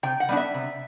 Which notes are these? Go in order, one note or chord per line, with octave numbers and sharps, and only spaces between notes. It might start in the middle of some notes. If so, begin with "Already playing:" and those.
C3 G5
F#5
G3 B3 D4
E5
C3